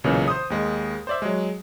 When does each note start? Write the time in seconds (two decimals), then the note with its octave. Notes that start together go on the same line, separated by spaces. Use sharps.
0.04 B1 A#2 C#3 E3
0.28 C5 D#6
0.50 D#2 G#3
1.07 C5 D5 E5
1.22 F#3 G#3